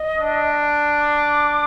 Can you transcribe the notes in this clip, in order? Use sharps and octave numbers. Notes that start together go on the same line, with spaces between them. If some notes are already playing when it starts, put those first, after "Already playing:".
Already playing: D#5
D4
D6